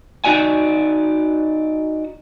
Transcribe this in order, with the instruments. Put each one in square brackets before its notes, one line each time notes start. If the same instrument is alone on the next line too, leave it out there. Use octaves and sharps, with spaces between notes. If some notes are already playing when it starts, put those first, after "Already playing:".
[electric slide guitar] D#4 F#4 D5 G#5